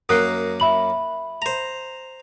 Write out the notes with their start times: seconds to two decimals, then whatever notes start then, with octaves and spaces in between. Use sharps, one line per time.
0.09 F#2 A#3 D#6 F#6 C7
0.60 E5 B5 F#7
1.42 C5 A#5